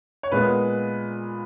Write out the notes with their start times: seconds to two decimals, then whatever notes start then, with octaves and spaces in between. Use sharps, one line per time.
0.23 C#5
0.32 A#2 G#3 B3 B4